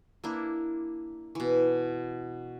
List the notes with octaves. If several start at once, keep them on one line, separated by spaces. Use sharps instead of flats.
A#3 D4 E4
B2 E3